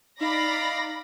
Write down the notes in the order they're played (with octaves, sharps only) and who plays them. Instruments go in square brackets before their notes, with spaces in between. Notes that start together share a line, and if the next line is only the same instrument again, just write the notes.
[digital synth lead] D#4 [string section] D5 B5 A#6 [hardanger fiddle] F5